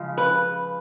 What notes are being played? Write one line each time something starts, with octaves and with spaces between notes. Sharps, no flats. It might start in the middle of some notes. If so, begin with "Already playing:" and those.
Already playing: C#3 F3 G#3
B4